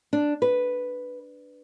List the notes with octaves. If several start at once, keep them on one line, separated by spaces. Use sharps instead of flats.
D4
B4